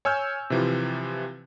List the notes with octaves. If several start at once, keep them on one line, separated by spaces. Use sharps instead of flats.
C#5 G#5 E6 F6 G6
C3 E3 F3